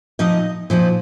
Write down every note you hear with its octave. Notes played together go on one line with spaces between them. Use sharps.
A#2 F3 D#4 D#5
A#2 F3 D#4